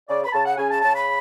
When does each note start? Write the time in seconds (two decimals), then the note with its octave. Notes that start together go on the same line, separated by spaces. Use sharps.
0.09 C#3 D5
0.25 B5
0.33 C#3 A5
0.46 F#5
0.57 C#3 G#5
0.70 A5
0.82 C#3 A5
0.95 B5